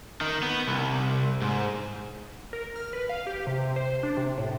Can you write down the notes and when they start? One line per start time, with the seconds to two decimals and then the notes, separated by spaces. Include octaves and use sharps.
0.21 D#3
0.43 B3
0.67 C2
1.42 G#2
2.53 A#4
2.76 F6
2.93 B4
3.09 F5
3.27 G4
3.47 C3
3.76 C5
4.03 D4
4.17 C3
4.38 A2